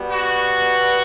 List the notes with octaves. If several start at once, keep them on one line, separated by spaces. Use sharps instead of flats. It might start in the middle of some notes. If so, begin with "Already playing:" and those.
Already playing: B2 G3 B3
F#4